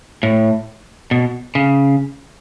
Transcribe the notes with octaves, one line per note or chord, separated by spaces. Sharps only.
A2
B2
C#3